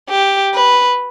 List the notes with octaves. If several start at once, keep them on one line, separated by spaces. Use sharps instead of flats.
G4
B4